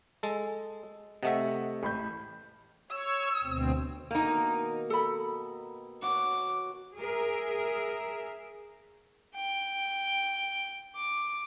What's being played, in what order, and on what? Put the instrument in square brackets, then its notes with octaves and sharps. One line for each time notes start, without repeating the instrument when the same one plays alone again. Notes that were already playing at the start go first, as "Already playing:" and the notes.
[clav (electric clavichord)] G#3 A4
[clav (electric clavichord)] C3 A3 E5 [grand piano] D#5 F#5
[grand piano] A1 B5 G6
[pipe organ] C#5 [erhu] E6
[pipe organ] D2 B2 C4
[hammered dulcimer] B2 D#3 [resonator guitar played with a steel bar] A#3 D#4
[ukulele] A4 B5
[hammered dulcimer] F#4 C#5 [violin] D6
[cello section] G#4 A#4 E5
[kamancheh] G5
D6